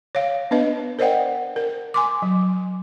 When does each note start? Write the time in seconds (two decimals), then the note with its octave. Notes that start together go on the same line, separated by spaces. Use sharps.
0.15 C#5 F5
0.51 B3 D4 B4 D#5
0.99 A#4 C5 D5 D#5 F#5 G5
1.56 A#4
1.94 G#5 C6 D6
2.22 F#3